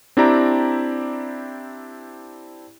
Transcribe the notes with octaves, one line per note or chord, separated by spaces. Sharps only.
C4 D4 E4 G4 D5 A#5